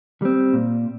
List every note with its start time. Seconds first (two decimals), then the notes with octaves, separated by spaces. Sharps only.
0.22 G3 C4
0.53 A#2